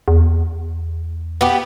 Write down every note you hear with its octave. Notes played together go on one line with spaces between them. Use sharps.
E2
B3 G4